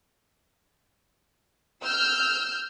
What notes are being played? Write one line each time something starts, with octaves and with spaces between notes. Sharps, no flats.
E6 F6 G6